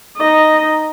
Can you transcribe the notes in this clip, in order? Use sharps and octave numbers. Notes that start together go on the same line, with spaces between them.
D#4 D#5